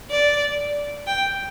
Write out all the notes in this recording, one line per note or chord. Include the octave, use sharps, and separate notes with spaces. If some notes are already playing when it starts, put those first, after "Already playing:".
D5
G5